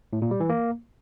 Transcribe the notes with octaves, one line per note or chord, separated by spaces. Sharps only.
A2
A#2
G3
E3
A#3